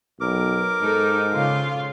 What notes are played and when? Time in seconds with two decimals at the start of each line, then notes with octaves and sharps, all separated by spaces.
0.21 B1 A#4 D6
0.82 G#2 D#4 A4
1.33 C#3 F4 F5